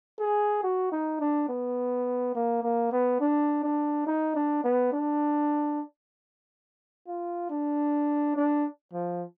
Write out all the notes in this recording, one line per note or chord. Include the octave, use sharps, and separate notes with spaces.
G#4
F#4
D#4
D4
B3
A#3
A#3
B3
D4
D4
D#4
D4
B3
D4
F4
D4
D4
F3